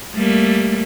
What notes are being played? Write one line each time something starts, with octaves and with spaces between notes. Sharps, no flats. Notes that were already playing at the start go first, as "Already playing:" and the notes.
G3 A3 A#3